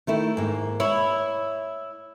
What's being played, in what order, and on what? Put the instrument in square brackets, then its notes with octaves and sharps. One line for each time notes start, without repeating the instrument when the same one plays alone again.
[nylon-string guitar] D#3 A3 E4
G#2 A#3
[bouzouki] E4 [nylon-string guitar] C#5